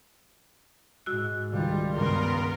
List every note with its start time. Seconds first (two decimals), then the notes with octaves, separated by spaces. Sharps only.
1.06 G#2 F#4 E6 F#6
1.53 C#2 D#3 G3 F4
1.95 G2 C#3 B3 A#4 C6